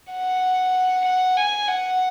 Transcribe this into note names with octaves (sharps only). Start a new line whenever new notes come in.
F#5
F#5
G#5
F#5